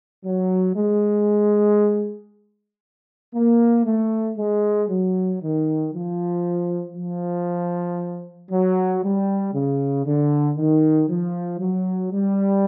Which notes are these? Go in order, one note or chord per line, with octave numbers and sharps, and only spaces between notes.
F#3
G#3
A#3
A3
G#3
F#3
D#3
F3
F3
F#3
G3
C#3
D3
D#3
F3
F#3
G3